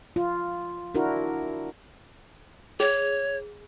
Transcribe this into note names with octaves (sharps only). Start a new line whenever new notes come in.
F4
D4 E4 F#4 A#4
G#4 C#5